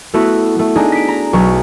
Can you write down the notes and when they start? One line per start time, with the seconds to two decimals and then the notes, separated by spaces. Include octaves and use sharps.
0.14 A3 B3 E4 F#4
0.59 A3
0.76 D4 D#4 G#4
0.92 B6 D7
1.08 A#5
1.33 B1 C#6